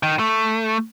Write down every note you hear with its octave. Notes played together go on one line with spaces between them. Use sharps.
D#3
A3